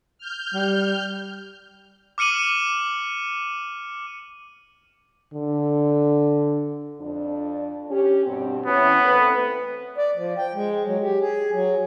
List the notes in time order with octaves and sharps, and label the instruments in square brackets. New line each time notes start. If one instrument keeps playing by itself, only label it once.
[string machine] F6 G6
[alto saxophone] G3
[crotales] D6 F6 C#7 D#7 F#7
[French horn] D3
[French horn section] F2 D4
C#4 G4
G2 B2 C4
[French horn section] E3 C#4 [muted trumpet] B3
[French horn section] A3 C4 B4
[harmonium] D5
F3
G5
G#3
F#3
G4
G#4
F#3